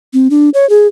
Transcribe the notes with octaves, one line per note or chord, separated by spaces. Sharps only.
C4
D4
C#5
G#4